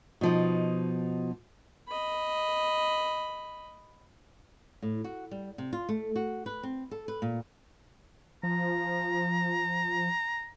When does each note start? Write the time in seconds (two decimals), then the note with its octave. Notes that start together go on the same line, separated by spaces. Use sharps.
0.21 B2 F3 D#4
1.88 D#5 B5
4.82 A2
5.04 F#4
5.31 G3
5.58 C3
5.73 F4
5.89 A3
6.16 F#4
6.46 B4
6.63 C4
6.91 A4
7.08 B4
7.22 A#2
8.43 F3 A#5